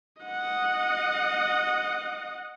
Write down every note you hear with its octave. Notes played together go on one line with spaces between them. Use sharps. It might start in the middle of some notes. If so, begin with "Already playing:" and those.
D#5 F#5